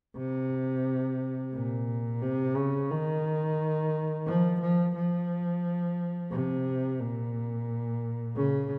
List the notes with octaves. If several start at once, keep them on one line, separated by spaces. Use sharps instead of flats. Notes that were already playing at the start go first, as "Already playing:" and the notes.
C3
A#2
C3
C#3
D#3
F3
F3
F3
C3
A#2
C#3